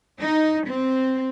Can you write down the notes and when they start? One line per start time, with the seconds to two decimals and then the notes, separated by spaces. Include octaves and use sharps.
0.19 D#4
0.66 C4